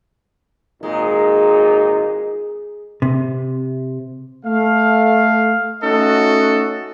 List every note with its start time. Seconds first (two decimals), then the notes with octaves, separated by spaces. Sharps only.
0.83 G#1 A#2 G#3 D#4
3.02 C3
4.45 A3 F5
5.83 A3 C#4 D#4 F#4 A4 D#5